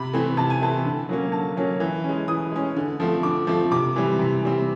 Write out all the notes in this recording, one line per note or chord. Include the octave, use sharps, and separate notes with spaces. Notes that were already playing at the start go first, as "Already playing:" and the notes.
Already playing: C3 B5
E3 A3 C4
C3 A5
G#5
E3 A3 C4 A5
D3
F#3 A#3 C#4
D3 A5
F#3 A#3 C#4
E3
G#3 C#4
E3 D#6
G#3 C#4
D3
F3 A3 C4
D3 D6
F3 A3 C4
C3 D6
E3 G3 C4
C3
E3 G3 C4